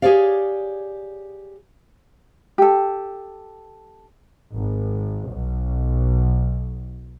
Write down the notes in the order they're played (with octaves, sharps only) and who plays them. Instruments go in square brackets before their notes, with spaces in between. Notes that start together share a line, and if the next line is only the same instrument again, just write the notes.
[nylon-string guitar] G4 G#4 A#4 C#5 D5 F5
[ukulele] G4 A4
[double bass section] G#1
B1